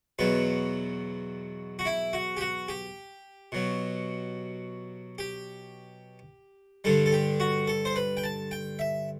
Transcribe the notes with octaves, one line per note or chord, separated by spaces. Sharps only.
E2 B2 F#3 B4
F#4
E4
F#4
G4
F#4
G4
B2 F#3
G4
G2 D3 G3 A4
A4
G4
F#4
A4
C5
B4
G5
A5
G5
E5